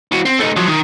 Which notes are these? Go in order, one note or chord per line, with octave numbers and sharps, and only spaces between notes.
E3 F#4
C4
A3 D#4
F3 F#3
D#3